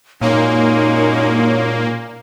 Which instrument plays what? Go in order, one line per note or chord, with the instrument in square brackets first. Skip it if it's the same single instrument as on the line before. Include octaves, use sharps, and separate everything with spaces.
[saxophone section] F#2 G#3 C#4 [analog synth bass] A#2 [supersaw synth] A#3 [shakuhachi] D#4